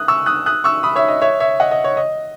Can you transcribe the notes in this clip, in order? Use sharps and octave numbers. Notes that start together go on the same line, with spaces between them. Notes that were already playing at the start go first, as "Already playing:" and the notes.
Already playing: D#6 F#6
C#6 E6
D#6 F#6
D#6 F#6
C#6 E6
B5 D#6
C#5 E5
D#5
C#5 E5
C#5 E5
D#5 F#5
D#5
C#5
D#5